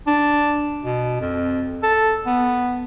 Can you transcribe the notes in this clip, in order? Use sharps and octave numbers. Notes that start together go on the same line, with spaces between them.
D4
B2
F2
A4
B3